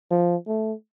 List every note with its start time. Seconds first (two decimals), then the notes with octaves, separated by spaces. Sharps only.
0.10 F3
0.47 A3